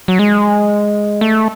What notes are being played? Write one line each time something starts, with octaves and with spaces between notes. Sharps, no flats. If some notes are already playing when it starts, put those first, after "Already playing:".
F#3
G#3
A3